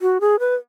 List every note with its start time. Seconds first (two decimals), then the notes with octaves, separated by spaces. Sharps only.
0.02 F#4
0.21 G#4
0.39 B4